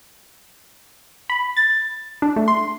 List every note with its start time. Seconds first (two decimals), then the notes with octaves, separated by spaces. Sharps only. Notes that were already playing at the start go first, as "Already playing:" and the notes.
1.30 B5
1.57 A6
2.22 D4
2.36 A3
2.48 C6